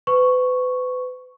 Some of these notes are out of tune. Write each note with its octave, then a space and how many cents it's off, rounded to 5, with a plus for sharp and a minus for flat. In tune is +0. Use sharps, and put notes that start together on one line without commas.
B4 +35 C#6 +0